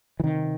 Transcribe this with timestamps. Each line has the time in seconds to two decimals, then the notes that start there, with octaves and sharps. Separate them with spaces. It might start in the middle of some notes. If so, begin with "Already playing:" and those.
0.20 E3
0.24 C3 D#3